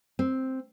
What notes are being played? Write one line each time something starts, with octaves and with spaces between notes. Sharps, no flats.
C4